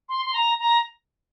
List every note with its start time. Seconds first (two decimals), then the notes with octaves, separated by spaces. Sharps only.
0.09 C6
0.25 C6
0.33 A#5
0.59 A#5